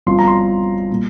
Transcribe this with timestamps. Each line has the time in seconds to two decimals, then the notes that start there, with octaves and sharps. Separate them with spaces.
0.06 G1 G2 F3 C4 F4 C6
0.19 A#5
0.27 C6
0.91 A#2 G3